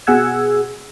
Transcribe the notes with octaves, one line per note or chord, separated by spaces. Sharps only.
B2 G#4 F#5 E6 G#6